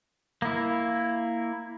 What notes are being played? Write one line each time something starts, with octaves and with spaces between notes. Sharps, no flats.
A#3 E4